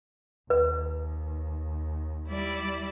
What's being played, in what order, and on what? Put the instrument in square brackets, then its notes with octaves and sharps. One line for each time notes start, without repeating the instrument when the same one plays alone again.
[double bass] D#2 [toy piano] B4
[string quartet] G3 E4 D5